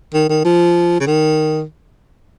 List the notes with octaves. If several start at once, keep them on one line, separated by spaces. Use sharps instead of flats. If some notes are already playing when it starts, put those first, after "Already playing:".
D#3
D#3
F3
C#3
D#3